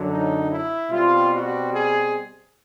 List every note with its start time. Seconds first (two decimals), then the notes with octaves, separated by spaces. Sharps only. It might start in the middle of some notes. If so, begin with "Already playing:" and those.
Already playing: F#2 D3 F#3
0.10 D#4
0.51 E4
0.91 B2 G3 C4 F4
1.32 F#4
1.72 G#4